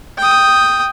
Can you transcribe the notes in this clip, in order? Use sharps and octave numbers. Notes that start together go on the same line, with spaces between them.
G5 D#6